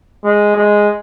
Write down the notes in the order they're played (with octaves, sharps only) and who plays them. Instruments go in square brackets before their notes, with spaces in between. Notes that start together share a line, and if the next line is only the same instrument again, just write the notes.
[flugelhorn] G#3
G#3